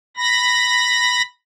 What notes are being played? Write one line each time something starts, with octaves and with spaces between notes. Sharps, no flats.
B5 A#6